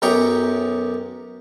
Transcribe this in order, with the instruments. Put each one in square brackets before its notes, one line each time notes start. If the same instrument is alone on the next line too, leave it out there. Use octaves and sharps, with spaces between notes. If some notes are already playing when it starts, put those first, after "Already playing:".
[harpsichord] B1 F#2 G4 D#5 A#5 C#6